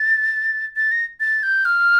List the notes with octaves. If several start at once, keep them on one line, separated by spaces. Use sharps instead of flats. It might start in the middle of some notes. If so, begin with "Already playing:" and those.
Already playing: A6
A6
A#6
A6
G6
F6